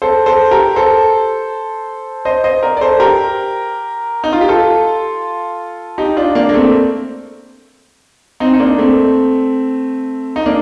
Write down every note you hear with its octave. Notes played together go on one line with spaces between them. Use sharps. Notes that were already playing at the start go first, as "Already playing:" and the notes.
A4 C5
A4 C5
G4 A#4
A4 C5
C5 D#5
C5 D#5
A#4 D5
D5
A4 C5
G4 A#4
D#4
F4
G4
F4 A4
D#4 G4
D4 F4
A#3 D4
A#3
A3 C4
C4 D#4
D#4
A#3 D4
A3 C4
D#4
A#3 D4